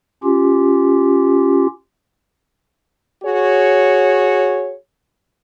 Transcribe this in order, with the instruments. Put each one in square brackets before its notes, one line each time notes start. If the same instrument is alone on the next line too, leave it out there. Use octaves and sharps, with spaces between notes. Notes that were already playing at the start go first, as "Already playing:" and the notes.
[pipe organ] C#4 F4 G4
[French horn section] F#4 G#4 C#5